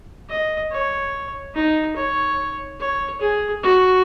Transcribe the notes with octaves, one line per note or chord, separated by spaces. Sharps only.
D#5
C#5
D#4
C#5
C#5
G#4
F#4